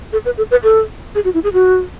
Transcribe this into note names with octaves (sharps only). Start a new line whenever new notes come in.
A4
B4
A4
B4
A4
G#4
F#4
E4
G#4
F#4